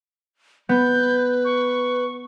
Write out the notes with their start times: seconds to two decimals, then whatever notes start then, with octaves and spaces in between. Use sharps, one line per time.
0.69 B3 B4 G6
1.45 C#6